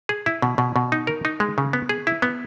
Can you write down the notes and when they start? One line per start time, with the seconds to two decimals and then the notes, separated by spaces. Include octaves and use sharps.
0.09 G#4
0.26 E4
0.42 B2
0.58 B2
0.76 B2
0.92 D#4
1.07 A#4
1.25 D#4
1.40 G#3
1.58 C#3
1.73 B3
1.89 G#4
2.07 E4
2.22 B3